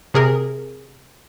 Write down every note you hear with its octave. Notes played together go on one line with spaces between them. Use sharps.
C3 G#4 A#4